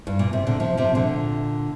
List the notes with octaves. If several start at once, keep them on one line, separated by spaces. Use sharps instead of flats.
G2
A#2
C3
A#2 D3
C3 F3
C3 F3
A#2 D3